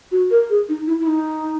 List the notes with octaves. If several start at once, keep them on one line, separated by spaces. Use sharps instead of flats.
F#4
A#4
G#4
D#4
E4
E4
D#4